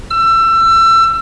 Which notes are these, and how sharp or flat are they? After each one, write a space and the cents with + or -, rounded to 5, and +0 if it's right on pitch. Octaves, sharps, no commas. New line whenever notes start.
E6 +25